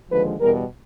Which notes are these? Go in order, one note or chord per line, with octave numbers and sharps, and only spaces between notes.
D#2 D3 F3 G#3 B4
E2 B2 G3 A#4